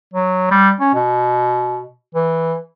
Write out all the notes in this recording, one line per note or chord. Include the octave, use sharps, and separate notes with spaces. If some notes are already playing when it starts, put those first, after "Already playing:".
F#3
G3
C#4
B2
E3